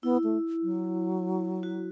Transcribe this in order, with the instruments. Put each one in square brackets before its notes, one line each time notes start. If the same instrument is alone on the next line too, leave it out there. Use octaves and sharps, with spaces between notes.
[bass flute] B3 [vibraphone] E4
[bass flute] A3
F#3
[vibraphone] F#4